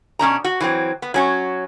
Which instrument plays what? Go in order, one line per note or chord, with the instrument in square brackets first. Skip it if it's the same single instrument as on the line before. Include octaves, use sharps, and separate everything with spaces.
[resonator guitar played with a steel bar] B2 C#4 D4 A#5
F#4
E3 F#3 C4
B3
F#3 C#4 F#4